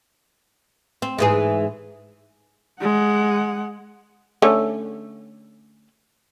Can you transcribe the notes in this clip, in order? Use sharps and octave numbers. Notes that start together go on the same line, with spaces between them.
C4
G#2 E3 G#4
G#3 F#5
D3 A3 C#4